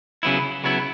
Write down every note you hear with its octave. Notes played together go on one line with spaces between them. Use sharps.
C#3 F#3 B3 E4
C#3 F#3 B3 E4